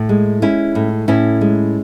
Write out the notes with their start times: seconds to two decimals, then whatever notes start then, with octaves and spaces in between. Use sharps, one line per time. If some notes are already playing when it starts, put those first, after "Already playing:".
Already playing: A2
0.09 G#3
0.42 G#3 C#4 E4
0.75 A2
1.08 A2 C#4 E4
1.41 G#3